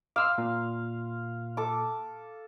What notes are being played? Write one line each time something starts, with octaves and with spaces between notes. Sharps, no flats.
F5 C6 D6 E6 F6
A#2
A4 D6